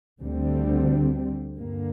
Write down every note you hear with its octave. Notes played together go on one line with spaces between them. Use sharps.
D2 D3 G3 C4
G2 D3 A#3